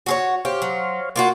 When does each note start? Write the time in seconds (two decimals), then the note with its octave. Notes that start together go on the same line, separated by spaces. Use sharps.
0.06 F#4 G#4 C#5
0.45 G4 C5 C#5 F5
0.62 F#3
1.16 A#3 F4 F#4